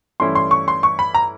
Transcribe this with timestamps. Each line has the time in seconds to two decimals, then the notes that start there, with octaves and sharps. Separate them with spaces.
0.20 G2 E3 A3 C#4 E4 C6
0.35 C6
0.51 C#6
0.68 C6
0.83 C#6
0.99 B5
1.14 A#5